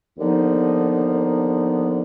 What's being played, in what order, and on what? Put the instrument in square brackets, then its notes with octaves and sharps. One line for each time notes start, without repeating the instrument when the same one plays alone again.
[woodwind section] D#2 D3 F3 B3 D#4